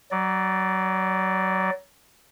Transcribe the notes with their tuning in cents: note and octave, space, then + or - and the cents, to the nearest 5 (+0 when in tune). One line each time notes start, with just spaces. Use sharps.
F#3 +25 D5 +0